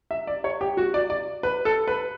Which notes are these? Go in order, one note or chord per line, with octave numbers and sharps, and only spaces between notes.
E5
D5
C#5
G4
F#4
D5
D5
B4
A4
B4